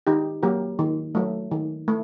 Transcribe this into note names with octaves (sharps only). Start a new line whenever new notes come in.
D#3 D#4 G4
F#3 A#3 G4 A#4
D#3
F#3 A3
D#3
A3